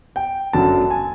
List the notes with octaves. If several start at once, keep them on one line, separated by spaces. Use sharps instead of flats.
G5
G1 F#2 D3 F#3 A5
G#5